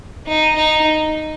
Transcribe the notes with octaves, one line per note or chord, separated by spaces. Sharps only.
D#4
D#4